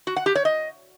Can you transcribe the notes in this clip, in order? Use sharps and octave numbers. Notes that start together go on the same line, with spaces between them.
F#4
F#5
G4
C#5
D#5